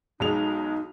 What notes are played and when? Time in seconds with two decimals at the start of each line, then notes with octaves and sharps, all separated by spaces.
0.20 B1 G#3 D#4 F7